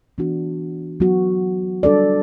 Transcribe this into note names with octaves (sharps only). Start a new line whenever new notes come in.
E3 B3 D4 F#4
F#3 B3 F#4
G3 D4 A4 D5